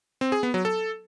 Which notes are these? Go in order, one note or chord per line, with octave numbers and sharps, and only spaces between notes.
C4
G#4
B3
F#3
A4